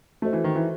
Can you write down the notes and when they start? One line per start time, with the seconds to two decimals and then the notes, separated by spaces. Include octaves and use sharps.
0.22 A3 F#4 A4 C5 D#5
0.33 E3
0.44 D#3
0.55 E3